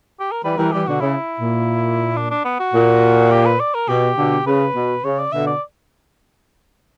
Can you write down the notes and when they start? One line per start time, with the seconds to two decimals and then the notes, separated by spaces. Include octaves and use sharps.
0.20 G4
0.32 A#4
0.44 E3 G3 B4
0.58 E3 G3 A#4
0.72 E3 G3 G4
0.87 B2 D3 F#4
1.01 C#3 E4
1.40 A#2
2.17 D4
2.31 D4
2.45 B3
2.60 F#4
2.74 A#2
3.31 G4
3.46 B4
3.60 D5
3.75 A#4
3.89 B2 G4
4.17 B2 D3
4.46 C#3 B4
4.75 B2
5.04 C#3 C#5
5.19 D5
5.32 B2 D3 E5
5.47 D5